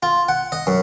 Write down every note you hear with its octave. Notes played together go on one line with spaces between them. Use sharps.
F4
F#5
D#5
F#2